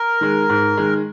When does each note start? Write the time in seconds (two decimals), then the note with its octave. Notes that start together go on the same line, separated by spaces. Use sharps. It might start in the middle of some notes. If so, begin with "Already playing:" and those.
Already playing: A#4
0.21 D#3 G#3
0.49 G#2
0.77 D#3 G#3